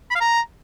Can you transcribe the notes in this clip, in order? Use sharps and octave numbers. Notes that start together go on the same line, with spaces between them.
B5
F5
A#5